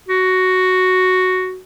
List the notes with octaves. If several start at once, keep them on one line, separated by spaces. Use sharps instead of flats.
F#4